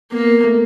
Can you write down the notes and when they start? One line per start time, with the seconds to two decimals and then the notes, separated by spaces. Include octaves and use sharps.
0.12 A#3 B3
0.44 A3